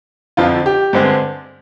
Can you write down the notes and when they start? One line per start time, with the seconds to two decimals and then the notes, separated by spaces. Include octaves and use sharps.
0.37 F2 D3 F3 F4
0.66 G4
0.93 G2 D3 G#3 C4